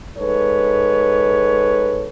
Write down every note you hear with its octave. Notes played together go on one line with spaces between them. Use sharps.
G#2 A4 B4 C#5